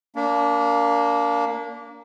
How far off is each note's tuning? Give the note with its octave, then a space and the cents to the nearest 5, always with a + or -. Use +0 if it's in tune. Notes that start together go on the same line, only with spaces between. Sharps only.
A#3 +0 D4 -35